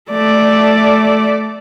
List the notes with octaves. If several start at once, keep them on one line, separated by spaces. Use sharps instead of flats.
A3 D5